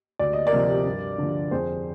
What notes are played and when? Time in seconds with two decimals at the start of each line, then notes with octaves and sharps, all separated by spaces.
0.19 D2 D5
0.33 D#5
0.47 A#4 D5
0.53 C3 F3
0.86 G2
1.18 D3 F3
1.51 F2 G#4 C5